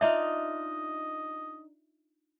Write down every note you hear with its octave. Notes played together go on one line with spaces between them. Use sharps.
D4 D#4 F4 D#5 E5